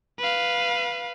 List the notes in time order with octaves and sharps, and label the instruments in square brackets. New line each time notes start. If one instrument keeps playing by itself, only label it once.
[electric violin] B4 F5